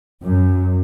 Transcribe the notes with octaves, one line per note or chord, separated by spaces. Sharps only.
F#2